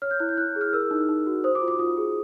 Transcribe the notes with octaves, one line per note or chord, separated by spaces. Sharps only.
C#5 F6
G6
E4 F#6
G6
E4 F#6
G#4
F6
A#4 E6
D#4
D#4
F#4
C5 D#6
D6
F4
D6
F4 D#6
G#4